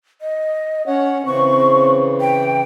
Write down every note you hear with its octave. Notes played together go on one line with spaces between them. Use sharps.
D#5
C#4 C#5 F#5
C#3 E3 C4 C#6
G5